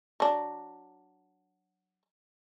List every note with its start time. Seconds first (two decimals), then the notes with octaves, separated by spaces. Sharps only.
0.20 F#3 D4